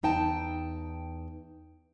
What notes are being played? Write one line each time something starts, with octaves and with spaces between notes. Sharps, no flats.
E2 D#4 G5 A5